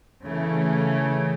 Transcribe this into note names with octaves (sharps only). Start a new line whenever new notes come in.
C#3 E3 A3